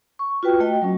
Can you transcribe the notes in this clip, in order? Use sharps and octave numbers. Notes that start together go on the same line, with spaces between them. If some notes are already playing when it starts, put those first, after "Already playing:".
C#6
F4 F#4 B4 G5
A3 F#4 D#5 G5
F#3 C#4